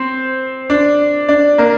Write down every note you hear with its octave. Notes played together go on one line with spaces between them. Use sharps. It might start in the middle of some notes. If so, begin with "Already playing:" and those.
Already playing: C4 C5
D4 D5
D4 D5
A#3 A#4